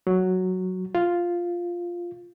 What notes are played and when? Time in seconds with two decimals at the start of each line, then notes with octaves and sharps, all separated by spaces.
0.07 F#3
0.95 F4